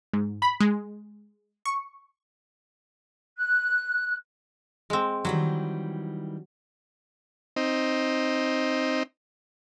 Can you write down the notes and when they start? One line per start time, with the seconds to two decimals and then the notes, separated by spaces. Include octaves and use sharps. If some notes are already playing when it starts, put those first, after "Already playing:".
0.13 G#2
0.42 B5
0.60 G#3
1.65 C#6
3.38 F#6
4.90 G#3 C4
5.25 D#3 E3 F#3 G3
7.56 C4 D#4